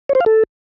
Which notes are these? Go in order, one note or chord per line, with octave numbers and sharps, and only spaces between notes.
C#5
C5
F5
A4